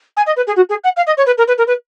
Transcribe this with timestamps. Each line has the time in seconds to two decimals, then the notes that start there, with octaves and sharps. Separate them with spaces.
0.17 G#5
0.27 D#5
0.37 B4
0.47 G#4
0.56 F#4
0.69 G#4
0.84 F#5
0.97 F5
1.07 D#5
1.17 C#5
1.26 B4
1.38 A#4
1.48 B4
1.58 A#4
1.67 B4